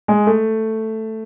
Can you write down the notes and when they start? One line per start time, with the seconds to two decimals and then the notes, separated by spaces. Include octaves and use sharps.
0.08 G#3
0.27 A3